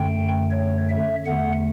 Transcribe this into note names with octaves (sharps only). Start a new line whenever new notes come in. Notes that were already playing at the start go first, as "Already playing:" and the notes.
Already playing: F#2 D3 A3 G5
C#5
E5
E2 D3 A3 F#5